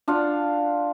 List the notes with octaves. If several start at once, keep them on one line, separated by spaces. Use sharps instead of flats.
D4 F4 F5 F#5